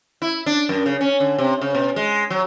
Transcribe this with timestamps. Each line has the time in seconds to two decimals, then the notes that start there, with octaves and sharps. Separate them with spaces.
0.22 E4
0.46 D4
0.69 F#2
0.86 C#3
1.01 C#4
1.20 D3
1.38 C3
1.61 C#3
1.75 B2
1.96 G#3
2.30 F#3